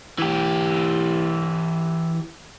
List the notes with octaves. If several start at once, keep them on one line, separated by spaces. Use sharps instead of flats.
E3 G4